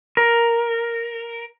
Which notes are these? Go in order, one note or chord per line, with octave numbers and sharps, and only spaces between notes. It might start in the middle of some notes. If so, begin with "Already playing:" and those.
A#4